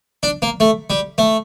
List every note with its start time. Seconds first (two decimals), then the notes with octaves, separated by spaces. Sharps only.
0.23 D4
0.42 A#3
0.60 A3
0.90 G3
1.18 A3